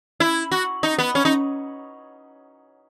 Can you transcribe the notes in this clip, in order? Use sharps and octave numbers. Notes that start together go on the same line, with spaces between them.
E4
F#4
D#4
B3
C#4
D#4